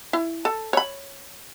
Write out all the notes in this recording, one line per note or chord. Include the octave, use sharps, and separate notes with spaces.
E4
A4
C#5 B5